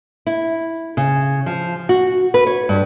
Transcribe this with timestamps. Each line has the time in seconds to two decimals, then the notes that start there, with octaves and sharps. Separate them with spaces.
0.27 E4
0.97 C#3
1.46 F3
1.89 F#4
2.34 B4
2.47 C#5
2.69 G2